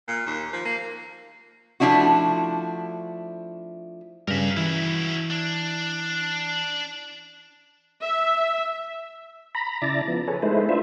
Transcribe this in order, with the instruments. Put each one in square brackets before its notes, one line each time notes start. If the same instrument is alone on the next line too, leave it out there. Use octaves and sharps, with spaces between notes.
[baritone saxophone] A#2
D#2
F3
A#3
[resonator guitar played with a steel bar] F3 A3 D4 E4 F#4
[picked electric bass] G2 C#3 [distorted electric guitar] A#4 E5
[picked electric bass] E3 [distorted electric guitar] F#3 E4
[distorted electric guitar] D4
[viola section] E5
[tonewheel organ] A#5 B5
C#3 E4 D5 A5 A#5
F3 B3
G#4 A4 B4 C#5
G#3 A3 D#4 E4 B4 C5
D4 F4 B4 C5 E5